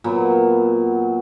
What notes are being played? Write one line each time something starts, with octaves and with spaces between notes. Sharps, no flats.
A#2 F#3 B3